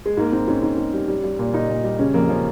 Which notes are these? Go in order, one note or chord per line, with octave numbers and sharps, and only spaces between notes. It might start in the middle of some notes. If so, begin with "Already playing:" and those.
G#3
G#2 A#3
G#2 C4
G#2 C#4
G#2
G#2
G3
G3
G3
A#2
A#2 D#4
A#2
G3
C#3 C#4
F2 A#3
F3 C#4